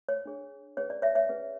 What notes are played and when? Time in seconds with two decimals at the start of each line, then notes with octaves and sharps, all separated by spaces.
0.09 C#5
0.26 D4 G#4 C#5
0.77 C#4 G#4 B4 C#5
0.90 D5
1.02 C#5 E5
1.15 C#5 E5
1.29 C#4 G#4 B4